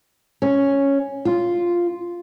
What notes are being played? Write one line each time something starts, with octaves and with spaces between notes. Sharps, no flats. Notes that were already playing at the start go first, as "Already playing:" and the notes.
C#4
F4